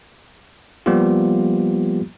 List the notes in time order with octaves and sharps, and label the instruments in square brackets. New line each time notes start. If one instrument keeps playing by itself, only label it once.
[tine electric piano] F3 G3 A#3 B3 F4 G4